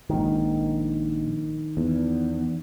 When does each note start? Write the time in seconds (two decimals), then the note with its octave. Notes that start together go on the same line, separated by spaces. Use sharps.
0.10 A#1 G#2 D#3
1.77 E2